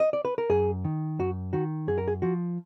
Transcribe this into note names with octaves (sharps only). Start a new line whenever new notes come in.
D#5
D5
B4
A#4
F#2 G#4
D#3
F#2 F#4
D#3 F#4
F#2 G#4
A#4
G#4
F3 F#4